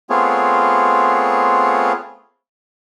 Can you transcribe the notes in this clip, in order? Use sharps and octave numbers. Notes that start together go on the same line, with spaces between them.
A3 B3 C4 F4 G#4 C#5